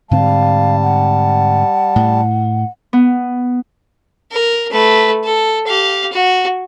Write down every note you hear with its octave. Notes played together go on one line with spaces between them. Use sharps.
G#2 D3 G3 C4 F5 A5
F#5
A2
B3
A#4
A3 B4
A4
G4 F5
F#4